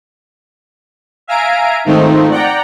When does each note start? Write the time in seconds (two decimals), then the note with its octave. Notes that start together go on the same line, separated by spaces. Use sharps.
1.27 E5 F5 G#5 A#5 D7
1.85 G#2 D#3 F3 A3 C4 D#4
2.31 D5 F#5 G5 A#5